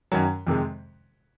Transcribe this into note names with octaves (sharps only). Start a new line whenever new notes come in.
F#2 D#3 F#3
F2 C3 D#3 G#3